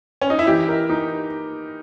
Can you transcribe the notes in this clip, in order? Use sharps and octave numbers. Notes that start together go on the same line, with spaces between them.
C#4
D#4
E4
E3 G4
A#4
D#4